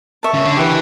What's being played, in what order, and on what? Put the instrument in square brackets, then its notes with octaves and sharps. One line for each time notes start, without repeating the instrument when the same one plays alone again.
[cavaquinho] C#5 E5 A5
[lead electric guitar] C#3
D3
[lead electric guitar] E3 [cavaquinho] G4 B4 E5